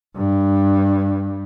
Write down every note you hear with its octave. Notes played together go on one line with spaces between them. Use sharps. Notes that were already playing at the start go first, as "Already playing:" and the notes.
G2